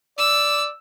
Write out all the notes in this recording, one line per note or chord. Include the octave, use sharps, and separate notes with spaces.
D5 E6